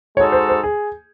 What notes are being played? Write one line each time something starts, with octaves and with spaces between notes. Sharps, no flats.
G#3 D#4 F#4 A4 C#5
C5
C5
G#4